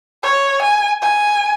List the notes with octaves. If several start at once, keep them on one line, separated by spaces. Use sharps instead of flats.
C#5
G#5
G#5